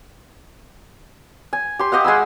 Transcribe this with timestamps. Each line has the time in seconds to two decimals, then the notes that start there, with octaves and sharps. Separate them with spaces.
1.53 G#5
1.79 G4 C6
1.92 G4 D#5 F5 F#5
2.04 G#3 G#5 B5 E6